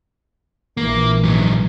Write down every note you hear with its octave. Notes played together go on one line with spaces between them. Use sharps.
A#1 E3 A#3
G#2 F#3